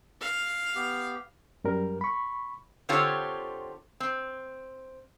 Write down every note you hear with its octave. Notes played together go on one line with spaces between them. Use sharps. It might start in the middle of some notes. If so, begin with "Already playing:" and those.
F5
B3 G4
F#2 G3 A#4
B5 C#6
D3 C4 F4 G4 A4 C#5
C4